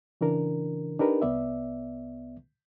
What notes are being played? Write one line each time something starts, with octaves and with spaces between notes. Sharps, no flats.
C#3 E3 D4 A#4
D4 D#4 G4 A#4 B4
C2 B3 D5 E5